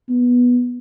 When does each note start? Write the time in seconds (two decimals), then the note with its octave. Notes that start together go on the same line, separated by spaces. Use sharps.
0.09 B3